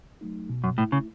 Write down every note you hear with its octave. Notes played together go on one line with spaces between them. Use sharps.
F#3 A3 D#4
B2
F#2
A2 A3 E4
C#3